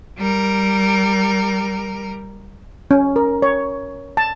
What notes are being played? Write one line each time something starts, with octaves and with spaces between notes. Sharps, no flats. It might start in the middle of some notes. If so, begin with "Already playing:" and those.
G3 A#4
C#4
A#4
C#5
A5